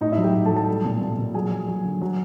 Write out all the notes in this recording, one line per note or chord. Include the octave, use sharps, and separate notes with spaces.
A2 D#4 D#5
E4 E5
F#3
G4 G5
A2
A4 A5
F#3
A4 A5
G3
A#2
A#2
A#2
F#3 G#4 G#5
F#3
F#3
D3
F#3